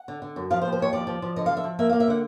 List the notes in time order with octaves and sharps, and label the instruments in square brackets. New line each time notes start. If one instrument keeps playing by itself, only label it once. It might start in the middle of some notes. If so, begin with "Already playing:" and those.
Already playing: [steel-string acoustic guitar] F#5
D3
D3
F#2
F3 F5
C5
D#2
C5
D#2 C#5
F3 D5
F3
F3
D3 D#5
F3 F5
E5
F3
A#3 E5
A#3 F5
E5
D3 F#5